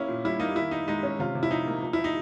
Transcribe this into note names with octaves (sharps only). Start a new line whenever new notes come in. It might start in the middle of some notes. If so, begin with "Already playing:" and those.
Already playing: A#3 C#4 E4
A#2
G3 E4
A#3 D#4
D#3 E4
D#3 D#4
G#3 D#4
C#4
C3 F4
C3
E4
F3 D#4
A#3
F3
E4
F3
D#4